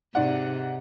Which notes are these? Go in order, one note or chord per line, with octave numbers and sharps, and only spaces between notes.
G#2 C3 D5 F#5